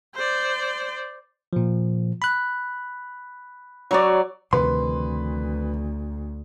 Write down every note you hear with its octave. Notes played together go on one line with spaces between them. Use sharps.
C5 D5
A#2 F3
B5 F#6
F#3 C#5 D5
D2 C3 D#3 F3 B4 C6